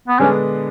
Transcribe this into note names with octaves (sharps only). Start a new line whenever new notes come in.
B3
D3 G#3 B3 C#4 D4